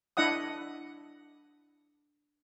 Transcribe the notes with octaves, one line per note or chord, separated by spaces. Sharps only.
D4 E4 D#5 F#5 D#6